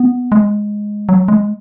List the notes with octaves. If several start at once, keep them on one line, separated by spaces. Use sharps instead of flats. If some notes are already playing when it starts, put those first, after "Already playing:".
Already playing: B3
G#3
F#3
G#3